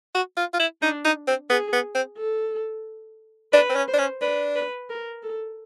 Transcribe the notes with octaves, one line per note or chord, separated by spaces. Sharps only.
F#4
F4
F4
E4
D4 D#4
D#4
C4
B3 G#4
B3
C4
A4
D4 B4
C4
C#4
C5
D4
C#4
D4 B4
B4
A#4
A4